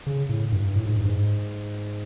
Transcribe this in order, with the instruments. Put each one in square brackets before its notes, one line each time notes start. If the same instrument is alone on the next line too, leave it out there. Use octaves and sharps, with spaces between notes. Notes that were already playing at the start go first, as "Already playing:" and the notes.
[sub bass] C#3
A2
G2
A2
G#2
G2
G#2